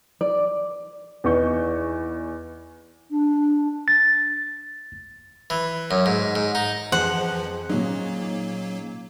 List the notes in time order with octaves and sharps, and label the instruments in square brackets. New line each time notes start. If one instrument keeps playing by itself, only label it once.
[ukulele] D5
[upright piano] E2 E3 D#4 C#6 G6
[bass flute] D4
[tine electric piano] A6
[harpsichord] E3
F#2
G#2
G#2
D#4
[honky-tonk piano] F2 [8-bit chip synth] E3 F3 [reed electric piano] G#4 C5 C6 [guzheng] F#5
[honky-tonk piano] A#2 C#4 D#4 [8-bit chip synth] F#3 A#3